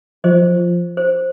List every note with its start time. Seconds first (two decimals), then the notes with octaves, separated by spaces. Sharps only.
0.24 F3 C5 D#5
0.97 C5